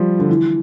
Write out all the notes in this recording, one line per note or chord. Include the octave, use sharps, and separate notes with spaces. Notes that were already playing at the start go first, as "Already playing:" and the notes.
Already playing: F3 G3
D3
E3